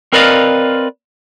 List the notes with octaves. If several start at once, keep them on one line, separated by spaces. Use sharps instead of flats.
C4 A#4 B4 D5 D#5 F5